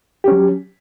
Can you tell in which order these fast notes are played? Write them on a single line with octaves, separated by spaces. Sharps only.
G4 C#4 F#3